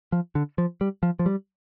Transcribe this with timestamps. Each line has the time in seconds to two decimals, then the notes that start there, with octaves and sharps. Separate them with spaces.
0.12 F3
0.35 D3
0.58 F3
0.81 G3
1.03 F3
1.19 F3
1.26 G3